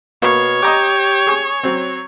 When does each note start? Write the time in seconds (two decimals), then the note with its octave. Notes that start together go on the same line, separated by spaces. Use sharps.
0.22 B2 A#3 C#5
0.62 G4 D#5 A#5 D6
1.27 G#4 C#6
1.63 F#3 C4